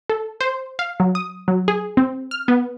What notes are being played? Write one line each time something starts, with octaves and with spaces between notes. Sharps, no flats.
A4
C5
F5
F#3
D#6
F#3
G#4
C4
F6
B3